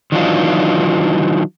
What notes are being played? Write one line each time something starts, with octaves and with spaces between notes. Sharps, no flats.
D#3 E3 F#3 D4 D#4 F4